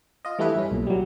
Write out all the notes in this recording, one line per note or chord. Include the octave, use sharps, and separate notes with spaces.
F4 D#5
E3 G3 A3 D4 E4 B4
G2 C#4
B1 A#2
F#3 G3